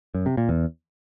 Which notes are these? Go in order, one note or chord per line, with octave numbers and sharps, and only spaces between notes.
F#2
C3
A#2
E2